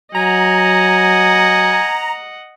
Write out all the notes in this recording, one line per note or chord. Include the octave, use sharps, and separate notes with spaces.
F#3 D#5 F#5 G#5 A#5